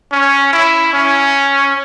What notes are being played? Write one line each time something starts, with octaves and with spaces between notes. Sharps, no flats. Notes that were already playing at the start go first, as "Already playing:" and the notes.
C#4
E4
C#4